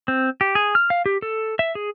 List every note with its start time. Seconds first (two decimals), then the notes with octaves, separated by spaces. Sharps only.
0.08 C4
0.41 G4
0.55 G#4
0.75 F6
0.90 F5
1.06 G4
1.22 A4
1.59 E5
1.75 G#4